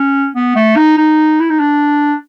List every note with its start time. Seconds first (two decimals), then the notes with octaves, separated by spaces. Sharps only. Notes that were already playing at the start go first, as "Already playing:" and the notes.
Already playing: C#4
0.35 B3
0.56 A3
0.76 D#4
0.97 D#4
1.40 E4
1.50 D#4
1.59 D4